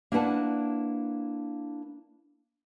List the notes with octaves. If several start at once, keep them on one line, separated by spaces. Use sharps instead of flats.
A#3 D4 E4 B4 F#5 A5